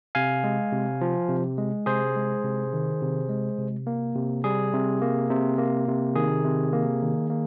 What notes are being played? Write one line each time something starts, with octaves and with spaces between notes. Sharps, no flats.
C3 F5 G#5
G#3
C3
F3
C3
G#3
C3 G#4 C5
G#3
C3
D#3
C3
G#3
C3
A#3
C3
G3 G#4
C3
A#3
C3
A#3
C3
D#3 G#4
C3
A#3
D#3
A#3